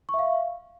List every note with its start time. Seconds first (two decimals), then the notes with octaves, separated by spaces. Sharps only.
0.09 C#6
0.14 E5
0.19 F5